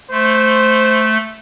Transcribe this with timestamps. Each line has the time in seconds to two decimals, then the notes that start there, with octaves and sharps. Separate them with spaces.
0.11 A3 C5